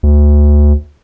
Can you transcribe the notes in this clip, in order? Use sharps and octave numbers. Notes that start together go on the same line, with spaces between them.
D2